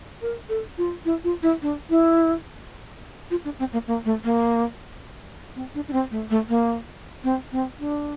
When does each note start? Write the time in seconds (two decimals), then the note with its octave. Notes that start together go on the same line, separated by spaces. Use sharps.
0.22 A#4
0.49 A4
0.78 F4
1.05 E4
1.24 F4
1.43 E4
1.62 D4
1.90 E4
3.31 F4
3.45 D4
3.59 C4
3.73 A#3
3.87 A#3
4.05 A3
4.24 A#3
5.56 C4
5.75 D4
5.88 D4
5.93 C4
6.11 A3
6.30 A3
6.49 A#3
7.24 C4
7.52 C4
7.80 D4